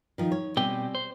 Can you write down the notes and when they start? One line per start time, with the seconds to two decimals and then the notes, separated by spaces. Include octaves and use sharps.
0.18 D#3 F3
0.32 C#5
0.57 B2 G3 C4 G4 G5 G#5
0.95 C5